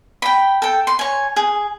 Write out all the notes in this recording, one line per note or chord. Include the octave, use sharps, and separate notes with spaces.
G5 B5
A4 G5
C6
C#5 G#5
G#4